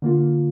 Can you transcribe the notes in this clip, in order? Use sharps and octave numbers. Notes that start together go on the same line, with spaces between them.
D3 A#3 F4